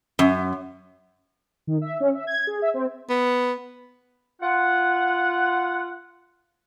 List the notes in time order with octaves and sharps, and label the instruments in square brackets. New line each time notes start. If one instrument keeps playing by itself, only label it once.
[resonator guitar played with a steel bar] F#2
[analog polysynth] D#3
E5
C#4
E5
G#6
G#4
E5
C4
[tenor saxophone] B3
[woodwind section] F4 F#5